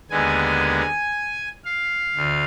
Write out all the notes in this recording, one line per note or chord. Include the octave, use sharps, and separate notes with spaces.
D#2 D3 G#3 B3 G#5
F5
D2